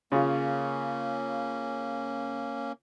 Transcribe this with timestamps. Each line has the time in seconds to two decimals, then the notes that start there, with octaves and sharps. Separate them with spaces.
0.12 C#3 A#3 C#4 F4